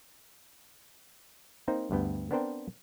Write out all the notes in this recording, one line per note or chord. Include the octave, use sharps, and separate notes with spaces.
A#3 C4 D#4 C5
D2 G2 B3 G5
B3 C4 D4 A#4 C5 G5